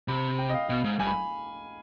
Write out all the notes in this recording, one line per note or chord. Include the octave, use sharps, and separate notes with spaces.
C3 B5
G5
D#5
F5
B2 F5
G#2
G2 G#5
B5